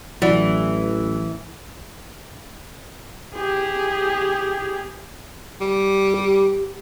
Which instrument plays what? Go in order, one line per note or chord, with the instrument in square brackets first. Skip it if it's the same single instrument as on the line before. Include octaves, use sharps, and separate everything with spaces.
[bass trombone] A1 [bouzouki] E3 [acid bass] F#3 [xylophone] D5 F#5
[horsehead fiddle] G4 G#4
[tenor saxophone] G3
[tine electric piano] G4